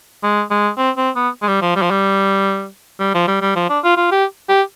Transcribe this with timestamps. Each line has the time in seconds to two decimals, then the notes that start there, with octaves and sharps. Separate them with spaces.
0.23 G#3
0.50 G#3
0.78 C4
0.97 C4
1.16 B3
1.42 G#3
1.48 G3
1.62 F3
1.76 G3
1.82 F3
1.91 G3
3.00 G3
3.14 F3
3.27 G3
3.42 G3
3.56 F3
3.70 D4
3.84 F4
3.97 F4
4.12 G4
4.49 G4